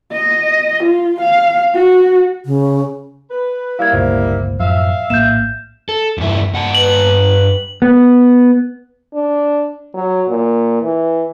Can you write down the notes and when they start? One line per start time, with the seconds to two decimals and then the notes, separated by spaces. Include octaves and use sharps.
0.13 D#5
0.84 F4
1.21 F5
1.75 F#4
2.46 C#3
3.31 B4
3.79 G3 A#3 E4 F5 G#6
3.93 G1 C#2 A#2 C5
4.60 F#2 A2 F3 E5 F5
5.10 A#1 A2 A#3 G6 E7
5.89 A4
6.18 E2 G2 E4
6.53 G2 F#5 A5
6.75 B4 F#7
7.82 B3
9.14 D4
9.94 F#3
10.28 A#2
10.82 E3